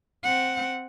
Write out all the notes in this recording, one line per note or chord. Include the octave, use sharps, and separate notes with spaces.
C4 F#5